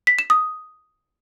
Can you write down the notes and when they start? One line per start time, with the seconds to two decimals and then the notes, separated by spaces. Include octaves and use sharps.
0.07 B6
0.19 E7
0.30 D#6